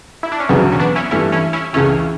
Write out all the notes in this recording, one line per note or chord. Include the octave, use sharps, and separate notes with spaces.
E4
D4
C#4
E1 D2 C#3 F#3 G3 B3
C#4
B3 D4
C#4 E4
G2 E3 A3 C#4 E4
C#4 E4
C#4 E4
C#2 C#3 E3 A3 C#4